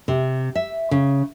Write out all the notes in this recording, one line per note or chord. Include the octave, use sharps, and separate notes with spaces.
C3
E5
C#3